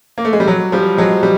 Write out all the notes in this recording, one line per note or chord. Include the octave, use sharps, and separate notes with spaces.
A#3
A3
G#3
G3
F#3
F3 G3
F#3 G#3
G3